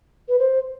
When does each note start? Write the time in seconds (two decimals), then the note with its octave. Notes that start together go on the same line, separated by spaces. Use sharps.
0.29 B4
0.39 C5